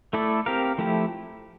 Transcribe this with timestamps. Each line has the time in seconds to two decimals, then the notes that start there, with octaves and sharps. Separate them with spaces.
0.13 A3 E4 A4 D5
0.46 C4 G4 A#4 F5
0.78 F3 A3 E4 G4